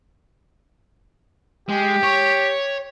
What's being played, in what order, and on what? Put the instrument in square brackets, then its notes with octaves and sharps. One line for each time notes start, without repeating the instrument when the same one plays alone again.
[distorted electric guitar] G#3 [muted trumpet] G4
[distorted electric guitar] C#5